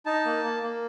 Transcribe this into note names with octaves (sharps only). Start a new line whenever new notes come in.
D#4 A5
A#3
A#3
A#3